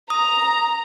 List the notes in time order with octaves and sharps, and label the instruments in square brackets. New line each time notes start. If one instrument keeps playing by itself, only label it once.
[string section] A#5 [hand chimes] D#6